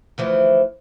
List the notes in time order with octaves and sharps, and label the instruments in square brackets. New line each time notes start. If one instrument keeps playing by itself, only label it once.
[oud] D2 E3 F3